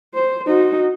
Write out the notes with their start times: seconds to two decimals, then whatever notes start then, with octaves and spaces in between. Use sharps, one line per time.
0.14 C5
0.47 D#4 F#4